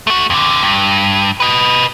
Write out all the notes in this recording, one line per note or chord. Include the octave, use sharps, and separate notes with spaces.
A3 F#4
F2 D3
G2
B4 D#5